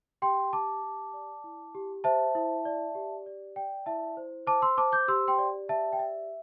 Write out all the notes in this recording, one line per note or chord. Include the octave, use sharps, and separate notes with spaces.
G4 G5 C6
G4 A5 D6
G4
D5
E4
G4
C5 E5 A5
E4
D5
G4
D5
D5 G5
E4 E5 A5
C5
C5 A5 D6
C6 E6
C5 A5 D6
D6 G6
G4 C6 E6
G5 C6
D5
G4 E5 A5
G5
D5 E5